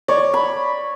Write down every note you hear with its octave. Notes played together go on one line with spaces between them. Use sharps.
C#5 D5
B5